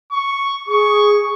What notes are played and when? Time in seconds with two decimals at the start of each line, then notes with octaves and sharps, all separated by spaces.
0.11 C#6
0.67 G#4 C#6